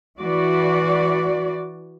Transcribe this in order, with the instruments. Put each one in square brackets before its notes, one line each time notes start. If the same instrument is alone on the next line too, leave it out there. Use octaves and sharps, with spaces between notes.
[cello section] E3 F#4 D5